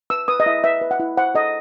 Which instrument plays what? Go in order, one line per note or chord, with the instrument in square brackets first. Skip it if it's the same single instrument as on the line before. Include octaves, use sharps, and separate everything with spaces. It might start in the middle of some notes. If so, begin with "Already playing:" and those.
[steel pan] B4 E6
B4 D#6
D#5
E4 E5
B4 E5
B4
F#5
E4
C5 F#5
A4 D#5